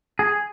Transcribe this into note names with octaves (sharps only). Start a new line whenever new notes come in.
G#4